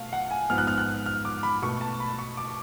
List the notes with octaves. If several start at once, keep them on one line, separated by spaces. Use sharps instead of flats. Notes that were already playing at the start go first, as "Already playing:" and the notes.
Already playing: B2 A3 F5
F#5
G#5
G#2 F3 B3 F6
F#6
F6
F#6
F6
D6
B5
B2 A3 C#6
A5
B5
C#6
D6